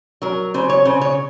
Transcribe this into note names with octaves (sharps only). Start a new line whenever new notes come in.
F#3 A#4
C#3 C5
C#5
C#3 C5
C#5